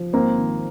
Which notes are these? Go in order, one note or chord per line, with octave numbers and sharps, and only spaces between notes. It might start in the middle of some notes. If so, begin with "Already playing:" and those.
Already playing: F3
G#1 A#3 C4
D#3